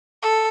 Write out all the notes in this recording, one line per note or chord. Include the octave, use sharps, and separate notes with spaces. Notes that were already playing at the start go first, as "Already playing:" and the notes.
A4